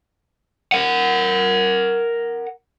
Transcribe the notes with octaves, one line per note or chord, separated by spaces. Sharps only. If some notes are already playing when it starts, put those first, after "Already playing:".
A#4 F#5